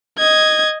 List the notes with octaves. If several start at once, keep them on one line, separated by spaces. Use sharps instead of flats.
D#5 G#6